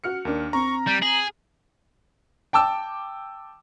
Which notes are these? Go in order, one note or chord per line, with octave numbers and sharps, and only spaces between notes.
F#4 F6 C#7
D#2 D4 A#4
C4 A#5 C#6
G3 G6
G#4 F#7
G5 A5 D6 E6